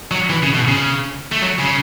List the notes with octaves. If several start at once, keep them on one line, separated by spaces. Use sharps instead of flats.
F#3
E3
C#3
B2
C#3
A3
F#3
C#3